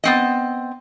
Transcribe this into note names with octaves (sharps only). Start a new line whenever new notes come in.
B3 C4 D#5